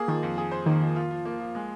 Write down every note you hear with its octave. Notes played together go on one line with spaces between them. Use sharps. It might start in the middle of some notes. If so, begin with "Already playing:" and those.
Already playing: A#3 G#4
D#3 F3
F2
G#4
C5
D#3 A#3
F3
F4
F3
A#3
F3
G#3